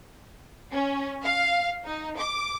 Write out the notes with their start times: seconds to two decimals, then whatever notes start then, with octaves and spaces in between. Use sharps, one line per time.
0.73 C#4
1.24 F5
1.86 D#4
2.18 D6